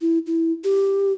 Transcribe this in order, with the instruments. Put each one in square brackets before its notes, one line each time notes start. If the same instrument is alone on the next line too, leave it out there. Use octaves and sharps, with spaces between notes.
[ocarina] E4
E4
G4